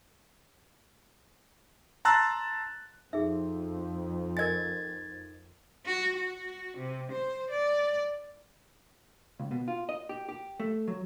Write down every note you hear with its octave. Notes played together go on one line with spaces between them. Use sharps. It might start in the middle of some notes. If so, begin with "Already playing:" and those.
A5 A#5 C6 E6 F#6 A6
F2 D#4 G#4 E5
A#4 D#5 G#5 G#6 A6
F#4
F#4
C3
C5
D5
C#2
B2
F4
D#5
G4
G4
A3
F#3